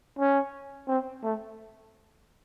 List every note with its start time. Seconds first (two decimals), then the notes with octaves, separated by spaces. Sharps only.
0.19 C#4
0.88 C4
1.23 A3